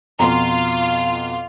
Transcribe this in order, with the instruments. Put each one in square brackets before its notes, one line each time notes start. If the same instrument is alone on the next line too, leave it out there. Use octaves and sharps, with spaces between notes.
[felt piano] F2 B2 [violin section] F4 [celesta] A#5